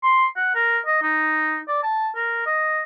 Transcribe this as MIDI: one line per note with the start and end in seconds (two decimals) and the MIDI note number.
0.04 0.26 84
0.36 0.53 78
0.55 0.79 70
0.86 1.01 75
1.03 1.60 63
1.68 1.82 74
1.83 2.09 81
2.15 2.45 70
2.46 2.83 75